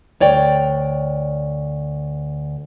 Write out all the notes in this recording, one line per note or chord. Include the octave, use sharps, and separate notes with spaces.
D2 C#5 D5 G5